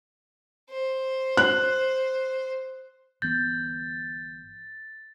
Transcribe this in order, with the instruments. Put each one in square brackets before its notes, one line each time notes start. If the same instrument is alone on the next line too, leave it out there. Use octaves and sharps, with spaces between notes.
[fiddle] C5
[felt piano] F#6
[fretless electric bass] G1 E3 B3 [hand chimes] G6 [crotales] A6